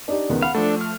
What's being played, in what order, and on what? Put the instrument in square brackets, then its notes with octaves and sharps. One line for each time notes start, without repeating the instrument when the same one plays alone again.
[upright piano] D4 D#4 G4
C#2 D#3 B3
[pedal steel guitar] F5 [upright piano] F#5 B5
[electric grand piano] F3 A3 [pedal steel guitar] D4 A4
[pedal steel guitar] F6